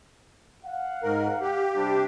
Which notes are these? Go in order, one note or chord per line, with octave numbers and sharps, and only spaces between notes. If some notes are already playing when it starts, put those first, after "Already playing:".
F5 F#5
G#2 A#4
G4
C3 G3 D4